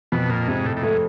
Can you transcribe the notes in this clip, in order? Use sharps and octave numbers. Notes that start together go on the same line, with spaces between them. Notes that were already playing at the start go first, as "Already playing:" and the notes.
F2 B2
A#2
G#2 C3
A2
A2
G#2 A3